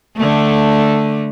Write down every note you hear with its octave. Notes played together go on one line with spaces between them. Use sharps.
D3 A3